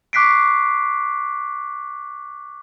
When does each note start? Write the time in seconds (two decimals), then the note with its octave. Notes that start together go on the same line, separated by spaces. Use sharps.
0.13 C#6 D6 F#6 B6 C7 D7